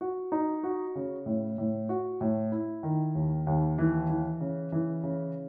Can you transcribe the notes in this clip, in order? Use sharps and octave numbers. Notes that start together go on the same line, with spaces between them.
F#4
D#4
F#4
C#3
A2
A2
F#4
A2
E4
D#3
D#2
D#2
E3
E3
C#3
E3
C#3